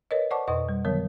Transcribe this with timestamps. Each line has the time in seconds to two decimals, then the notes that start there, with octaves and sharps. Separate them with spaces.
0.11 A#4 B4 C#5 D#5
0.31 C5 D5 F#5 A5 C#6 D6
0.48 F2 B2 B4 D#5 C#6 D#6
0.69 G3
0.85 D3 D#3 F#3 B3 A#4 C#5